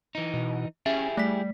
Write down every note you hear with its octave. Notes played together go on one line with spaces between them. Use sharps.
E3 D#4
B2
C#4 E4 G4 G#4 E5
G3 A3 B6